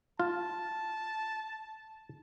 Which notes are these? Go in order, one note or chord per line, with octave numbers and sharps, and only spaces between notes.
F4 A5